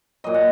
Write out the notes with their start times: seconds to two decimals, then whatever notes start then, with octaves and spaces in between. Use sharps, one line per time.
0.24 A#2 F#3 D#5
0.34 F#5